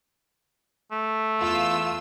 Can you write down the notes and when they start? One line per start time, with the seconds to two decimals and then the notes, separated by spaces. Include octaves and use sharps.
0.92 A3
1.40 E2 F4 E6